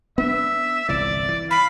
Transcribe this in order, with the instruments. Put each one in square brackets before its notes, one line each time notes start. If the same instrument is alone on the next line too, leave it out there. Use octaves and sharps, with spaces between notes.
[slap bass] B3 D4 [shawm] E5
[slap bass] G1 C2 E3 [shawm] D5
[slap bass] E3
[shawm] F5 [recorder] B5